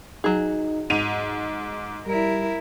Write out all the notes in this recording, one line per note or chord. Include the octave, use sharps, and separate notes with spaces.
F#3 D#4 G#4
G#2 D6 D#7 F7
G3 E4 A#4